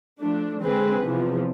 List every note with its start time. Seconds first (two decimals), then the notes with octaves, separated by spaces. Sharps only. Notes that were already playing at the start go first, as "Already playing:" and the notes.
0.20 F3 A3 D4
0.62 D3 G#3 C4 G#4 B4
1.03 E2 C3 F3